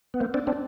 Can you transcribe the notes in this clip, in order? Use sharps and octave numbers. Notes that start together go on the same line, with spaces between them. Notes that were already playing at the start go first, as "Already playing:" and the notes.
B3
A#3 C4
C4 D4
C4 D4